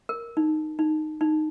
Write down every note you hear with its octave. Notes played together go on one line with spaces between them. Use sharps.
A#4
D#4
D#4
D#4